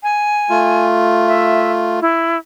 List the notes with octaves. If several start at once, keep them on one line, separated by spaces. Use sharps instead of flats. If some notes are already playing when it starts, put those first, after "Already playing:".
G#5
A3 F4
E5
E4